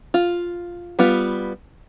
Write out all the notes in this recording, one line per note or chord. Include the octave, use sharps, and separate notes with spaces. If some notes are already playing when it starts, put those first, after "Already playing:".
F4
G3 B3 F4